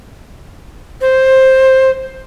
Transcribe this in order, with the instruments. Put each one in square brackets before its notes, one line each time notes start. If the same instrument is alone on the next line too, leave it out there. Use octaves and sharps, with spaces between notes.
[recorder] C5